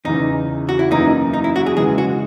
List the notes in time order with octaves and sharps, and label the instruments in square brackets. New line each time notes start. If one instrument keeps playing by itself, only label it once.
[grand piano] E2 C#3 E3 [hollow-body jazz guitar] D#4
[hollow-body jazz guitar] F#4
E4
[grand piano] F#2 E3 A#3 E4 [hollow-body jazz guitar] D#4
[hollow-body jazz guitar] D#4
E4
F#4
G#4
[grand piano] C#3 E3 G#3 [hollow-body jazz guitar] G#4
[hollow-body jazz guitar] F#4